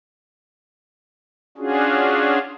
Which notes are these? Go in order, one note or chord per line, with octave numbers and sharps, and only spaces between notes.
C#4 D4 F4 F#4 G#4